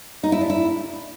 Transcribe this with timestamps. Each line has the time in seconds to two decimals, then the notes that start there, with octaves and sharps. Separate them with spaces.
0.23 D#4
0.32 E4
0.41 D4
0.50 E4